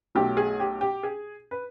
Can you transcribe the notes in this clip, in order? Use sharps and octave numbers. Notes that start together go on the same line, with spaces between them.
B1 B2 F#3 A3 G4
G#4
G4
G4
G#4
B4